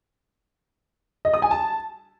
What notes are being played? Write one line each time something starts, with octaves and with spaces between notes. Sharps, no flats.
D#5
D#6
G#5
A5